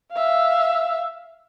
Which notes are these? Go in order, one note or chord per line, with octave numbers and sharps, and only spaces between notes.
E5 F5